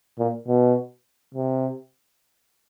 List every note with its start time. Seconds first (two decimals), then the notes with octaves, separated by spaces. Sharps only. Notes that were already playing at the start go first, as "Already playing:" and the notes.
0.19 A#2
0.48 B2
1.35 C3